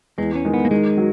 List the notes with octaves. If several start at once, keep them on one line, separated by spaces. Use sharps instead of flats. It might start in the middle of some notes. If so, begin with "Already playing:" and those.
E2 G#3
C#4
D#3 G#3
B3
A#3
D#3 G#3
F#3